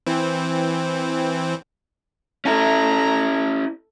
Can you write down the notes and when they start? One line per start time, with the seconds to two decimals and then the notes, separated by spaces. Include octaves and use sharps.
0.07 E3 C4
2.45 A3 C#4 E4 A#5